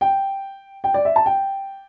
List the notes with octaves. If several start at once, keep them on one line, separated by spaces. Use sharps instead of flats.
G5
G5
D5
E5
A5
G5